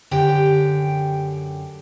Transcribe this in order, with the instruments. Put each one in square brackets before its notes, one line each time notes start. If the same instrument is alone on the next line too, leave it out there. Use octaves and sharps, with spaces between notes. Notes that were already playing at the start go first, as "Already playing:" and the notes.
[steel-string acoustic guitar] F#2 D3 G4 G5